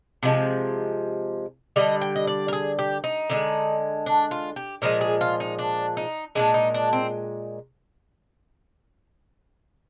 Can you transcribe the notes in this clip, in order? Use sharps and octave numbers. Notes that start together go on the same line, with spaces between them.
C3 F3 G#3
D3 G3 D#5
G5
D#5
D5
A#4
G#4
G4
D#4
D3 F3 G#3
D4
F4
G4
A#2 F3 G#3 A#4
G#4
F4
D#4
D4
D#4
A#2 F3 G#3 D4
D#4
D4
C4